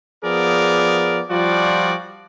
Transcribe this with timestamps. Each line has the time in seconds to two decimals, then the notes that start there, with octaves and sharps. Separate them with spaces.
0.24 F3 B3 G#4 A#4 D5
1.31 F3 G3 F4 F#4 D5